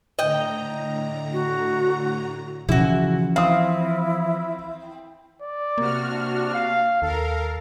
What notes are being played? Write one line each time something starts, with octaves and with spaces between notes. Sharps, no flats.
A2 D3 D#5 G5 A#5
F#4
C#3 E3 F3 E4 F#4
C4 E4 F5 D#6
D5
C3 A#3 F#4 F6
D4
F5
D#2 A4 A#4 F5